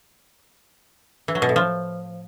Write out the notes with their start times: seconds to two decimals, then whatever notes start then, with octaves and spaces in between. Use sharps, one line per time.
1.28 E3
1.35 F#3
1.42 B2
1.49 A2
1.56 F3